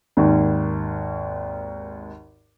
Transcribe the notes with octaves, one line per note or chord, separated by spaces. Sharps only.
G#1 D#2